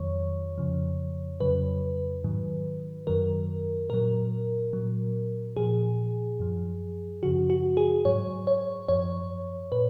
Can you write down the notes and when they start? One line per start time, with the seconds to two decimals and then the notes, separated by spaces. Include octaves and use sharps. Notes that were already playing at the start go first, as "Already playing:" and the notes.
Already playing: F2 D#3 F#3 C#5
0.58 F2 C#3 F3
1.40 F2 C#3 F#3 B4
2.24 G#2 D#3 F#3
3.07 F#2 D#3 F#3 A#4
3.90 A#2 F#3 A#4
4.73 A#2 F#3
5.57 A#2 F3 G#4
6.40 F#2 F3
7.23 F#2 C#3 F3 F#4
7.50 F#4
7.77 G#4
8.05 G#2 F#3 C#5
8.47 C#5
8.88 F#2 F3 C#5
9.72 A#2 B4